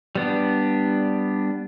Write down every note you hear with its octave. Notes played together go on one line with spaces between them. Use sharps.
G3 B3 D4